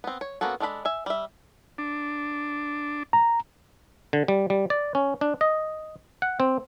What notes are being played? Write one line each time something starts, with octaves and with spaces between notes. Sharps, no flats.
B3 C4
C#5
A#3 B3 C#4 F#4 A4
G#3 D4 A4 A#4 B5
E5 G#5
G3 E5
D4
A#5
D3
G3
G3
D5
C#4
D4
D#5
F#5
C4